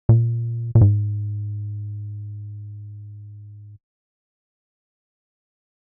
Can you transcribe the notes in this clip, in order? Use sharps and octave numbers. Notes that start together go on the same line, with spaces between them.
A#2
A#2
G#2